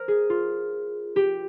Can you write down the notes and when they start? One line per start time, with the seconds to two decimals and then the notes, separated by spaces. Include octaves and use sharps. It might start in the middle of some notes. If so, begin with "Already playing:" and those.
Already playing: A#4 C5
0.08 G#4
0.30 F4
1.16 G4